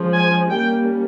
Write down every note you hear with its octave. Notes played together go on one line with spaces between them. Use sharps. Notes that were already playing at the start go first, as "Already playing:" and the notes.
Already playing: F3 G#3 C#4
G#5
G3 A#3 C#4 G5